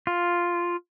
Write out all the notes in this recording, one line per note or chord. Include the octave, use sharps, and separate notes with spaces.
F4